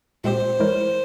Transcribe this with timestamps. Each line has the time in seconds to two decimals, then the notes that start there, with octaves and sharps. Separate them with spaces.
0.24 A#2 G#3 C4 G4 C5
0.59 E3 G#3 E4 A#4 C#5